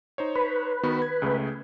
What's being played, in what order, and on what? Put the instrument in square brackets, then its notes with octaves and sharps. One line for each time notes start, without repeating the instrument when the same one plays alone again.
[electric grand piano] D#4 C5 C#5
[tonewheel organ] B4
[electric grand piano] D#3 B3 F#4
G#6
C#2 C#3 A3